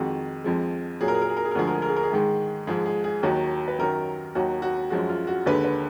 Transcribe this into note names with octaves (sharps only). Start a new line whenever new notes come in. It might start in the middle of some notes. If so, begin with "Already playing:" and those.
Already playing: F2 D#3 G#3 F#4
F2 F3 G#3
A#2 F#3 G#4
A#4
G#4
A#4
G#4
A#4
G#4
A#4
D2 D3 F3 G#3 G#4
A#4
G#4
A#4
G#4
A#4
G#4
G#2 D#3 G#3
G#2 F3 G#3 G#4
G#4
G#4
D#2 D#3 F#3 F#4
B4
F#2 D#3 F#3 A#4
D#2 D#3 F#3 F#4
F#4
F#2 F3 G#3 F#4
F4
F#4
D#2 D3 G#3 B4
B4